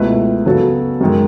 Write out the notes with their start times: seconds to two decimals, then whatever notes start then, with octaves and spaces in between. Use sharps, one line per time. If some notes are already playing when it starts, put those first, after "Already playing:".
Already playing: C#2 B2 A3 E4 B4
0.46 C#3 F#3 B3 F#4 A4
1.01 F#2 D#3 G#3